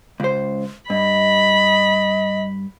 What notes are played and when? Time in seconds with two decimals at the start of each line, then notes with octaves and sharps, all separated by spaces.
0.20 C#2 C5
0.90 G2 D#5 B5